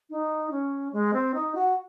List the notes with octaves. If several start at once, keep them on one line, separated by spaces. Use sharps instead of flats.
D#4
C#4
G#3
C4
D#4
F#4